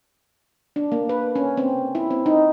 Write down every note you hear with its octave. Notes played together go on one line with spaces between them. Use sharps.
D4
A#3
B4
C#4
C4
E4
C4
D#4